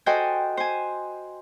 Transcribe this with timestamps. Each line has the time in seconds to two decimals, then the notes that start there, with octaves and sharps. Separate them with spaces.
0.06 F#4 A4 C5 D#5 G5 G#5
0.57 C5 G#5